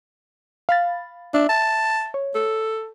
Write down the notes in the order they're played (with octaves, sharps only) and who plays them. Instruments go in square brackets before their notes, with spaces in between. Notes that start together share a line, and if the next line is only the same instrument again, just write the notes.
[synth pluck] F5 B5 A6
[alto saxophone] D4 [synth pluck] E5
[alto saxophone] A5
[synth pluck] C#5
[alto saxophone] A4